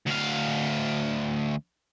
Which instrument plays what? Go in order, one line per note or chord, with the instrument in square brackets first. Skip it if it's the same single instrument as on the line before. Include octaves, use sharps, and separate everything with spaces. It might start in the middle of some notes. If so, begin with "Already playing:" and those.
[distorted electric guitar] D2 F5